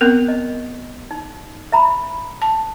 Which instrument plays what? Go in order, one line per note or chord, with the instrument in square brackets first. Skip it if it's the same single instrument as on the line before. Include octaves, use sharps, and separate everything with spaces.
[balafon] B3 C4 A#4
[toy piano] D#5
D#4
E5 A#5 B5
[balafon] A5